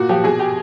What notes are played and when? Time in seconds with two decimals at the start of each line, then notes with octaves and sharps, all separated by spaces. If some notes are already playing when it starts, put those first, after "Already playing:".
Already playing: A#2 F#4
0.09 F3 G4
0.24 B2 G#4
0.39 G4